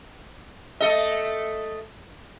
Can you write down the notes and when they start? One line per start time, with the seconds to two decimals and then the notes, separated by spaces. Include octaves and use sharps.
0.80 A3 A4 D#5